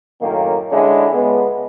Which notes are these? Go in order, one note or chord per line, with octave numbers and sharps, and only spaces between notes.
F#2 A2 D#3 A#3
D3 G#3 C#4 D4 E4
C#2 G#3 B3